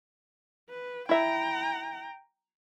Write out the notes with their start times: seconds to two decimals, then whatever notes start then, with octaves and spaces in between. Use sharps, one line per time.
0.69 B4
1.09 E4 E5 G5 A#5